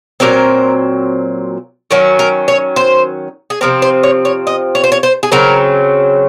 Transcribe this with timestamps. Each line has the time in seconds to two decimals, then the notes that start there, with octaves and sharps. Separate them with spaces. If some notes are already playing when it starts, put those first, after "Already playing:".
0.20 A#2 F#3 C4 A#4
1.91 D#3 F#3 C#4 A#4
2.19 A#4
2.48 C#5
2.76 C5
3.50 G#4
3.61 C3 F3 C4 A#4
3.82 C5
4.03 C#5
4.25 C#5
4.47 D#5
4.75 C#5
4.84 C5
4.92 C#5
5.03 C5
5.23 G#4
5.32 C#3 F#3 C4 A#4